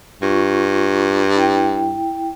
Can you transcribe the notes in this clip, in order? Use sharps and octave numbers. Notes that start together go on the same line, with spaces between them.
G2 F4 C#6
E4 G5